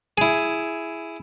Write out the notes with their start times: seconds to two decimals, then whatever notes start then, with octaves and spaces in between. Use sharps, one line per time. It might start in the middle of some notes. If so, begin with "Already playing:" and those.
0.18 E4 G#4